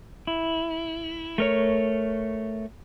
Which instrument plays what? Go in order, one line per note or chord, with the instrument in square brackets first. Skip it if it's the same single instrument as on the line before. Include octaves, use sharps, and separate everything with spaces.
[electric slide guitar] E4
A3 A#4 C#5